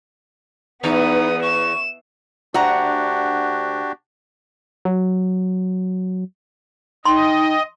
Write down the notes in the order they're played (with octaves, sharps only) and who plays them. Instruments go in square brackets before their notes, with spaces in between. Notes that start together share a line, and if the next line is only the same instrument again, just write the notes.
[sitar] E2 [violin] B3 D#6 [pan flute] D#4
[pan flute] C#6 [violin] E7
[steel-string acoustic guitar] D2 F#5 A#5 [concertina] D4 F#4 G4
[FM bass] F#3
[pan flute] D#4 [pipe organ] D#5 [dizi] G5 [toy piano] C6